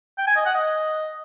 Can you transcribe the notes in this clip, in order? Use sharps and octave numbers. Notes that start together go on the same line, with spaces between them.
G5
G#5
D#5
F#5
D#5